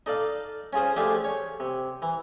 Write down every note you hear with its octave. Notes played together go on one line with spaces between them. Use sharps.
D#4 A4 D5 F5
C#4 F4 G#4 C5
F3 A3 D4 G4 G#4 F5
C#5
C3
E3